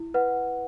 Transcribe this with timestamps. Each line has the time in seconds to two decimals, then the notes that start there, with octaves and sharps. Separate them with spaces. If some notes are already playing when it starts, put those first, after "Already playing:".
Already playing: E4
0.14 B4 F#5